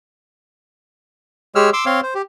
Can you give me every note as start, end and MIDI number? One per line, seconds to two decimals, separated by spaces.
1.55 1.70 56
1.55 1.70 67
1.55 1.70 68
1.55 1.70 73
1.55 1.70 88
1.55 1.70 89
1.73 1.85 84
1.73 1.85 86
1.73 1.85 88
1.86 2.00 60
1.86 2.00 73
1.86 2.00 77
1.86 2.00 84
2.03 2.14 72
2.15 2.22 67